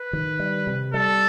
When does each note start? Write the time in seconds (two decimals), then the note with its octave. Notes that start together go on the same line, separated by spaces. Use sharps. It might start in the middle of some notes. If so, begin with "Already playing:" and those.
Already playing: B4
0.13 D#3
0.40 G3
0.67 C3
0.93 G3 A4